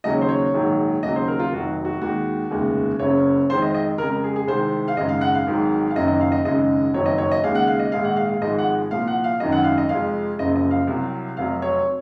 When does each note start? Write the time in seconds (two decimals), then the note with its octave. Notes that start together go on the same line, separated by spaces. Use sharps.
0.04 D#2 C#3 F#3 D#5
0.13 C#5
0.21 C5
0.29 C#5
0.54 A#1 G#2 D#3 F#3
1.03 D#2 C#3 F#3 D#5
1.16 C5
1.28 A#4
1.40 F4
1.52 F1 F2 D#3 F#3 F#4
1.85 F#4
2.01 D#2 D#3 G#3 F#4
2.51 F1 D#2 C#3 G#3
2.99 F#1 F#2 C#3 C#5
3.49 F2 D#3 G#3 C5
3.62 D#5
3.74 D#5
3.98 F2 C#3 G#3 A#4
4.10 A#4
4.24 G#4
4.36 G#4
4.47 C2 C3 D#3 G#3 C5
4.88 F5
4.96 G#1 F#2 C#3 G#3 D#5
5.09 F5
5.21 F#5
5.35 F5
5.47 G#1 G#2 D#3 F#3
5.91 F5
5.96 F#1 F#2 D#3 F#3 D#5
6.08 D#5
6.21 F5
6.32 D#5
6.45 G#1 F#2 C#3 G#3 D#5
6.94 F#1 F2 D#3 F#3 C#5
7.06 D#5
7.18 C#5
7.31 D#5
7.44 D#2 C#3 G#3 F5
7.55 F#5
7.67 F5
7.80 D#5
7.92 A#1 G#2 D#3 G#3 F5
8.04 F#5
8.16 F5
8.29 F5
8.42 G#1 G#2 F3 G#3 D#5
8.58 F#5
8.91 C2 A#2 F3 F5
9.08 F#5
9.24 F5
9.40 G#1 F#2 D#3 F#3 D#5
9.52 F#5
9.64 F5
9.78 D#5
9.89 F2 C3 F3 G#3 F5
10.39 F#1 F#2 C#3 F3 D#5
10.56 D#5
10.71 F5
10.87 C2 C3 F#3
11.37 F1 F2 C3 F#3 F5
11.62 C#5